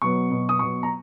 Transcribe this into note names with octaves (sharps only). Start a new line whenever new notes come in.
B2 F#3 B3 C#6
B2 F#3 B3
D#6
B2 F#3 B3 C#6
A#5